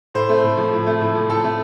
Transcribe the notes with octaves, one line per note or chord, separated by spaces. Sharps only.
A2 C5
A3
A2
F3
A2
A3
A2
F3
A2 A4
A3